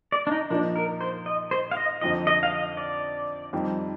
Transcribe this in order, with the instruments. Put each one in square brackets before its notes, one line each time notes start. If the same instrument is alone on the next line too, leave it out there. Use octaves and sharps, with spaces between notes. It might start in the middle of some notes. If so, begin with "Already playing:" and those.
[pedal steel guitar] D5
D4
D#4
[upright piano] A#2 F3 A#3 D#4 [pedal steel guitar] D4
[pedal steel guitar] A#4
C5
D#5
C5
F5
D#5
[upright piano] F2 D3 F3 C4 D#4 [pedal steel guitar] D#5
[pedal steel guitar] D#5
F5
D#5
D5
[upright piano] F2 D#3 G3 C4 D#4